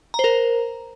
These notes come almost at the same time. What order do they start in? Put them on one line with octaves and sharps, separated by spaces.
A#5 C5 A#4